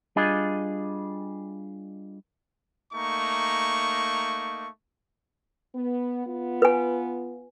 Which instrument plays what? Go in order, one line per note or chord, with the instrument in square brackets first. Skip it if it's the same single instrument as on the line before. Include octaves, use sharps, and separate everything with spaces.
[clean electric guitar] G3 D4 F4 G#4 D#5
[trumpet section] A3 A#3 D#4 C#6
[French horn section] B3
B3 F4
[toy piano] B4 G#5